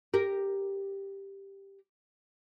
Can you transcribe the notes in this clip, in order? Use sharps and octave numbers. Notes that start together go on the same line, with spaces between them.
G4 A#4